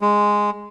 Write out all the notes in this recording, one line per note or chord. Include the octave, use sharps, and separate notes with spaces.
G#3